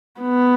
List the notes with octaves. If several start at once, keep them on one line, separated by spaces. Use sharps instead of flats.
B3